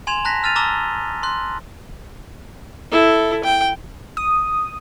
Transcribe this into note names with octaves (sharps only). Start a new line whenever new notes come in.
G#5 C6 G#6 E7 F7
A5 A#5 F#6 A#6 B6
E6 F6 A6 D#7 F7
A5 A#5 D6 E6 G7
C6 F#6
E4 A4
G5
D#6